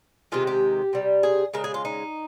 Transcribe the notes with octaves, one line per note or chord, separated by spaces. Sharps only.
C3 D#3 G#3 F4
G4
C3 G3
G#4
C#3 G#3 A#4
G#4
F4
D#4